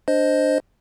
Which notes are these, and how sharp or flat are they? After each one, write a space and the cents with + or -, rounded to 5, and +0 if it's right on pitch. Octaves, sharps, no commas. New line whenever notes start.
D4 +0 C5 +0 D#5 +0